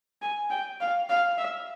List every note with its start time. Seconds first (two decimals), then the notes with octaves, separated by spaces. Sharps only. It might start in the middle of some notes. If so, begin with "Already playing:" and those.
0.22 G#5
0.50 G5
0.81 F5
1.09 F5
1.38 E5